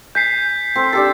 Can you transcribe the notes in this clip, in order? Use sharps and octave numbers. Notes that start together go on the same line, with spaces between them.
G#5 G6 B6 C7
C4 A4 C5
D4 G4 A4 A6